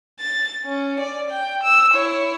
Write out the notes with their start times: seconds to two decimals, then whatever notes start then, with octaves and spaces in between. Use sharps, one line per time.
0.20 A6
0.65 C#4
1.00 D5
1.31 G5
1.64 E6
1.94 E4 C#5